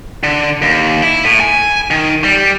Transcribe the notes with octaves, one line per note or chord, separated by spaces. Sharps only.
D3
D#2
E4
A2
G#5
D#3
G3